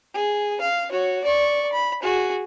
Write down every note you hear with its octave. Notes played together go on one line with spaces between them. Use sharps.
G#4
F5
F#4 C#5
D5 C#6
B5
F#4 G#4